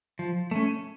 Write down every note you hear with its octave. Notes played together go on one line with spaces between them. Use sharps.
F3
A3 C#4